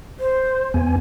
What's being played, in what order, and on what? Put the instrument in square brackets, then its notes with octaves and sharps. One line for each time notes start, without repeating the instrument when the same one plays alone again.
[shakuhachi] C5
[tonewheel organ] E2 B3 G#5